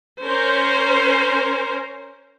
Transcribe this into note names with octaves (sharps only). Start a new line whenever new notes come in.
C#4 A#4 C5